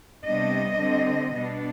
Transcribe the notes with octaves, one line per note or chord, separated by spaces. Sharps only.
C3 G3 B3 D4 D#5
D3 G3 C4
B2 B3 D4